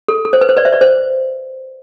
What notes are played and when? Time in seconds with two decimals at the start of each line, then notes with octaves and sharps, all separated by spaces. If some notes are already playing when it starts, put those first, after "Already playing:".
0.08 A4
0.25 A4
0.33 C5
0.41 B4
0.49 C5
0.57 B4 D5
0.65 C5 E5
0.73 B4 D5
0.81 C5